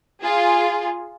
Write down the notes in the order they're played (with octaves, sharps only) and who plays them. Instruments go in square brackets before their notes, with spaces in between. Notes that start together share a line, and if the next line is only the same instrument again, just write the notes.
[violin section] F4 G#4